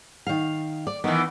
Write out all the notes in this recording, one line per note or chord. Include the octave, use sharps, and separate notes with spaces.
D#3 F5
D5
D#3 E3 B3